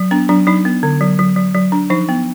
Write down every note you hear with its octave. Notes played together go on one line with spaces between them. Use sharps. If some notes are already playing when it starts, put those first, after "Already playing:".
Already playing: F#3
B3 D4
F#3 D4
F#3 D#4
B3
D3
F#3
F#3
F#3
F#3
D4
F3 D#4
B3